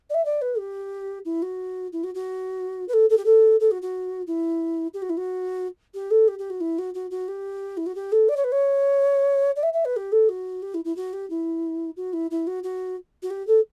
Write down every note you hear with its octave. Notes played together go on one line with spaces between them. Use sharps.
D5
E5
D5
B4
G4
E4
F#4
E4
F#4
F#4
B4
A4
A4
G4
A4
A4
F#4
F#4
E4
G4
F#4
E4
F#4
G4
A4
G4
G4
F#4
E4
F#4
F#4
F#4
G4
E4
F#4
G4
A4
D5
C#5
B4
C#5
D5
E5
E5
B4
G4
A4
F#4
G4
E4
E4
F#4
G4
E4
F#4
E4
E4
F#4
F#4
F#4
G4
A4